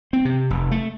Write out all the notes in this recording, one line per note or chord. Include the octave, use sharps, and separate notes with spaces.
C4
C3
F1
A3